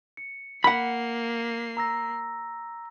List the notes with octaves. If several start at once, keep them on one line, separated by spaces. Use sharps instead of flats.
C#7
A#3 F#5 B5 C7
A#5 E6 A#6